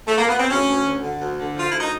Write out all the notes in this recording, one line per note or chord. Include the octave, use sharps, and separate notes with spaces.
A3
A#3
B3
C4
D2 C#4
D2
D2
D3
D2
D3
F3 F4
D2 E4
D#4